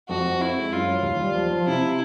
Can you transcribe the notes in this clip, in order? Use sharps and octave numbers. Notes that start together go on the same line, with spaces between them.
F2 F#4
F2
C4 E4
G#3
F#2 F4
F#3
D#2
G3
F3
F3
C3 E4